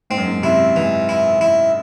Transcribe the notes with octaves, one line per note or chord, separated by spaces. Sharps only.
G#2 C4
F#2
G#2
C3 E4
G#2 E3
E4
E4